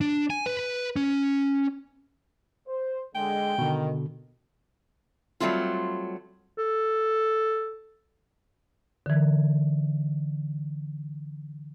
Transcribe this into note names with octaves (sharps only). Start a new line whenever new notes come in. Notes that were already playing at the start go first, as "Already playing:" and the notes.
D4
G#5
B4
C#4
C5
D3 G#3 G5
B2 D3 D#3
F#3 G3 A3 C4 F4
A4
D3 E3